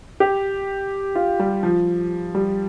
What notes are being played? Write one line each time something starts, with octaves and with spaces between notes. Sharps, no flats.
G4
F4
G3
F3
G3